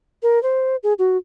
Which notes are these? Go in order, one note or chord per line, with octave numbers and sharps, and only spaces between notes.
A#4
C5
G#4
F#4